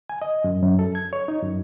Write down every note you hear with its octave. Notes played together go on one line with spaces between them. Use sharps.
G#5
D#5
F#2
F#2
A4
G#6
C#5
D#4
F#2